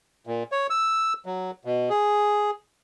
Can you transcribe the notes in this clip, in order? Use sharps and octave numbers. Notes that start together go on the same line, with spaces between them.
A#2
C#5
E6
F#3
B2
G#4